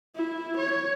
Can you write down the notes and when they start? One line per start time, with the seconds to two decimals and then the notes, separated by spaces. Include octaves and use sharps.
0.16 E4
0.57 C#5